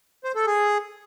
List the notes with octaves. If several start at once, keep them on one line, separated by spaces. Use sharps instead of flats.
C5
A4
G#4